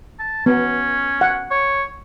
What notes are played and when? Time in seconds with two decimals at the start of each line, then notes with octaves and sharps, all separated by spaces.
0.20 A5
0.46 B3 C#4
1.21 F#5
1.51 C#5